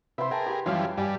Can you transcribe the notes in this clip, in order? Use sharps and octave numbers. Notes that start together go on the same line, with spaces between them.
C3 B4 E5 C6
G#4 A#4 G5 A5
G4
F#2 E3 F3 G3 C#5 F5
G2 G3 G4 D5 G#5